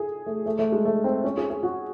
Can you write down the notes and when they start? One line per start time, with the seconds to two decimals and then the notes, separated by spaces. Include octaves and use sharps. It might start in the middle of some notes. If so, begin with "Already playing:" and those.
Already playing: G#4 A4
0.26 A3
0.46 A3
0.59 A3
0.72 G#3
0.85 A3
1.04 C4
1.24 C#4
1.37 G#4
1.50 G#4
1.63 F#4